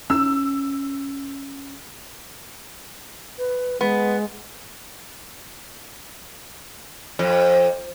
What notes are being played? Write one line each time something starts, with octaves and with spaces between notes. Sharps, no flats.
C#4 E6
B4
G#3 B3
F2